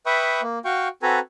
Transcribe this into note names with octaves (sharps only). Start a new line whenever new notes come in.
B4 E5 G5 B5 C#6 D#6
A#3
F#4 F5 G5 C#6
C4 F#4 A4 B4 G#5 A#5